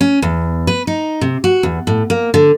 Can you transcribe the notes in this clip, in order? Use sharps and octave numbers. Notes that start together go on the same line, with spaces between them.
C#4
E2
B4
D#4
C3
F#4
E2
A2
A#3
D3